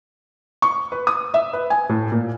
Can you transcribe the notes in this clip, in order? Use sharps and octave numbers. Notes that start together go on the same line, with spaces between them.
C#6
B4
D#6
E5
B4
G#5
A2
A#2